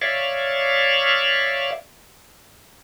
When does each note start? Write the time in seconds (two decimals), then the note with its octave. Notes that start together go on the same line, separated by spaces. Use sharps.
0.02 C#5 D5 E5 F5